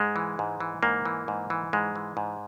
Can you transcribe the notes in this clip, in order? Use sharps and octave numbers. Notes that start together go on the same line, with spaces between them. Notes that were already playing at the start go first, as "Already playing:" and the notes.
Already playing: G#2 G#3
E3
G#2
E3
G#2 A#3
E3
G#2
E3
G#2 G#3
E3
G#2